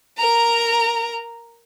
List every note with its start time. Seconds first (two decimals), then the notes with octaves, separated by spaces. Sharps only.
0.18 A#4 A#5